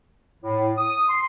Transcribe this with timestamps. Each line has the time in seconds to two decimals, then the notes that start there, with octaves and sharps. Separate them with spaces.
0.42 A2
0.78 D#6
1.09 C6